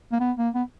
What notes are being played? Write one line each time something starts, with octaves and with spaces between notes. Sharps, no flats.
A#3
B3
A#3
B3